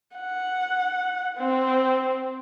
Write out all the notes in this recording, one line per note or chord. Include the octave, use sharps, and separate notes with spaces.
F#5
C4